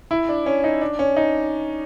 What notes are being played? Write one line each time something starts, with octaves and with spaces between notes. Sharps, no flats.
E4
D4
C#4
D#4
D4
C#4
D#4